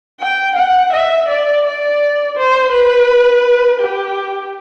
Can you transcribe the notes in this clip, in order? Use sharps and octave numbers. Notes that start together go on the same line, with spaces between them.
G5
F#5
E5
D5
D5
C5
B4
G4